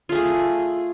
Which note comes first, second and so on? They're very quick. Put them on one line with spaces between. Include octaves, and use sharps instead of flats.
F4 A3 G#4